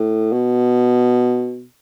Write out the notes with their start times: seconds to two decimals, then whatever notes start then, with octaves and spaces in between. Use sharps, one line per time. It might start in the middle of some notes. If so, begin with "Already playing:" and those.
Already playing: A2
0.32 B2